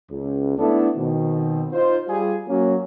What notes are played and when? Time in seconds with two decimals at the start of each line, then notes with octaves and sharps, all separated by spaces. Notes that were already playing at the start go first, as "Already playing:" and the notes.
0.10 C#2
0.58 A3 B3 D4 E4 A4
0.97 B2 D#3 C4
1.72 D#4 F4 C5
2.07 G3 F4 G#4
2.48 F#3 A#3 C#4